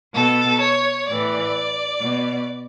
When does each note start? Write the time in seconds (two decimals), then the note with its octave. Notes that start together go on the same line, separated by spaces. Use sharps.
0.14 B2 A4
0.60 C#5
1.07 A2 E3 D5
2.01 B2